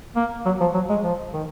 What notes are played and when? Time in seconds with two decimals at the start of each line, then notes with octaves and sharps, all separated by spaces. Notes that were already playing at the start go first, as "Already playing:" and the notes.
0.16 A#3
0.45 F#3
0.60 F3
0.74 F#3
0.89 G#3
1.04 F3
1.33 D#3